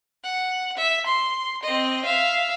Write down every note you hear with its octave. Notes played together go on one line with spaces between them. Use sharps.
F#5
E5
C6
C4 D#5
E5 F5